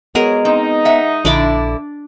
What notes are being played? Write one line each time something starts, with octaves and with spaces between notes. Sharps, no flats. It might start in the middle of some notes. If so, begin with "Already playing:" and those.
F#3 G#3 B3 G#4 A#4
C4 D#4
E5 F#5
A#1 G2 D3 D4 E4 D5